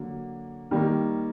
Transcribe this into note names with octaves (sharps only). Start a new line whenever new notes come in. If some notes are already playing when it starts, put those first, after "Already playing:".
Already playing: D3 F#3 A#3
D#3 G3 A#3